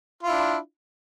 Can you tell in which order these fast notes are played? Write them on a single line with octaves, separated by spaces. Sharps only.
F4 E4 D4